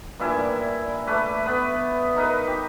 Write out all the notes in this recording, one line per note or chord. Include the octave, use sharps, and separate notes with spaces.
G2 A#2 E4 G#5
A3 B4 D5
B3 B4
D#4 A#4 B4
G4